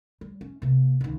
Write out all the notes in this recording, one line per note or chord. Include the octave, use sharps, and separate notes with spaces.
G3
C#4
C3 A#3
C#2 D#3